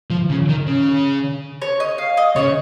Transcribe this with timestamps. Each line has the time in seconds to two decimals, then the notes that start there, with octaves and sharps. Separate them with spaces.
0.10 F3
0.30 C#3
0.49 D#3
0.67 C#3
1.62 C#5
1.80 D#5
1.98 F5
2.17 D#5
2.36 C#3 C#5